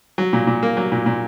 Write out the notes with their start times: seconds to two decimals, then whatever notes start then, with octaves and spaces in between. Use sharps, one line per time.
0.18 F#3
0.33 A#2
0.47 A#2
0.63 A#3
0.77 F#3
0.92 A#2
1.06 A#2